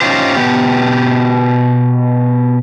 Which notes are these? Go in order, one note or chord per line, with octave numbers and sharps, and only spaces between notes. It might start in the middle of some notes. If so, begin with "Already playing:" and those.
C#4 D#4 F4 G4 C5
B2 E3 B3 G4